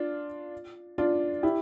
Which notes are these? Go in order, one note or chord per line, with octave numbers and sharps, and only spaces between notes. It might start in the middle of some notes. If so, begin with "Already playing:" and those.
Already playing: D4 F4
D4 F4
E4 G4